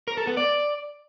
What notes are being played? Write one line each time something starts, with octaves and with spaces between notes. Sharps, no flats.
A#4
A4
B3
D5